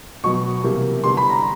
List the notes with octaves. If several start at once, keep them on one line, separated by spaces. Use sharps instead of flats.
B2 F#3 B3 C#6
C3 E3 G3 A#3
D3 G3 B3 D4 C6
B5
A#5